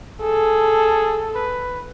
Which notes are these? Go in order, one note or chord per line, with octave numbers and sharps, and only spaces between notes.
G#4 A4
B4